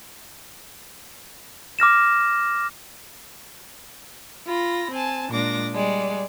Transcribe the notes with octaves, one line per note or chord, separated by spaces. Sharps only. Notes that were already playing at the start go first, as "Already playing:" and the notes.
D6 F6 A#6 E7
F4 B5 A#6
C4 G#5 A5
A#2 G#3 D4 D6 A#6
G3 G#3 D5